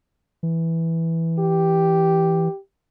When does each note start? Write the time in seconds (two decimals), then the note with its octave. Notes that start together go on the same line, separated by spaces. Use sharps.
0.43 E3
1.39 G4